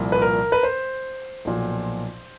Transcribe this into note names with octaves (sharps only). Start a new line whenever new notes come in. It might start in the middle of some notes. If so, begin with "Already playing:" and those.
Already playing: C2 A#2 F3
B4
A#4
B4
C5
B1 A#2 F3